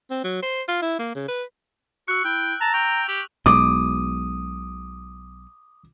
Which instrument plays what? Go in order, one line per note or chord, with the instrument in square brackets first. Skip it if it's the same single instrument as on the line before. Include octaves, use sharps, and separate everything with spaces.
[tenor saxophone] C4
F#3
C5
F4
E4
A#3
C#3
B4
[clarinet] F#4 [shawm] C#6 [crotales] E6 F#6
[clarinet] E4 [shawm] G5
[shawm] A5 [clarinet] A#5 [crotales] F7
[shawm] G5 [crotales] C#6 F7
[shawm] G4 [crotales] F#7
[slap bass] B1 B2 G#3 [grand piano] D6 [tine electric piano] D#6